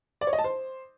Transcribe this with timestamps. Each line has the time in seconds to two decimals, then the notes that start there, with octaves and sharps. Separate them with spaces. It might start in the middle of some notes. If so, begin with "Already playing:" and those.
0.21 D5
0.27 C#5
0.33 D#5
0.39 A5
0.44 C5